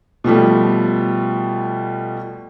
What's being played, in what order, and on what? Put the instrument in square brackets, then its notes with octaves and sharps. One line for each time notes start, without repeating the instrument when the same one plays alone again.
[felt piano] B2 F3 G3 A3